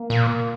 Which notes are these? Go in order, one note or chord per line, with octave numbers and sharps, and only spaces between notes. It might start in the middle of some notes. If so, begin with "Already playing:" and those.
Already playing: A#3
A#2